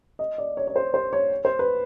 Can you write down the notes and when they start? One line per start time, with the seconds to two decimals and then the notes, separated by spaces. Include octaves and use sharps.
0.19 D#5
0.38 D5
0.57 C#5
0.67 C#5
0.76 C5
0.94 C5
1.13 C#5
1.45 C5
1.59 B4